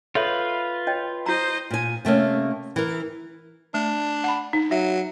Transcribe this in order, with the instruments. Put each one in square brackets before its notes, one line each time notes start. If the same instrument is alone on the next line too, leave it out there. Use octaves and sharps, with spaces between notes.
[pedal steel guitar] F4 B4 [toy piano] A4 C#5 E5
[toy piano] C#5 D#5 G5
[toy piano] E4 A#5 [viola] C5 D#5
[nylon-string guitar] A#2 G#5
C3 A3 A#3 C#4
E3 A#4
[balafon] A3 [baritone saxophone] D4
[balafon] F#5 B5
D#4
[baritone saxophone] F#3 [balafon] E5